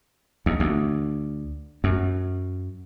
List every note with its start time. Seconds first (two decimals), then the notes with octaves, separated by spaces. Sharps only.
0.46 D#2
0.60 D2
1.84 F#2